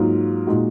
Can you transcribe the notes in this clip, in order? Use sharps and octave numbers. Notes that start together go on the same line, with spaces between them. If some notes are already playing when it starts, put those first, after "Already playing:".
Already playing: G#2 F#3 A#3 F4
A#2 G#3 D#4 F#4